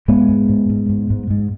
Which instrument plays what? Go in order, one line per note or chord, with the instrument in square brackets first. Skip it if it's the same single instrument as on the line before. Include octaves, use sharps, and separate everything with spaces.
[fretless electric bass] G#2 G#3 B3
G#2
G#2
G#2
G#2
G#2
G#2